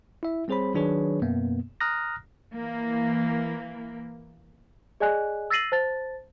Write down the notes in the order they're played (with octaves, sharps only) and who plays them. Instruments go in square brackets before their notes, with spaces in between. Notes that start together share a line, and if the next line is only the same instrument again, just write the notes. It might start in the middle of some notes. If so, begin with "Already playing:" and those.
[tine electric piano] E4 E5
G3 C4 G#4 C5 C#5 B5
D#3 F#3 D4 G#4 B4 C#5
F#2 B2 A#3 B3
A#5 D#6 F6 F#6 A#6
[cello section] E3 A#3
[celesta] G#4 D5 D#5 G#5 F#6
E6 A6 A#6 C7 D#7 F#7
C5 A5 A6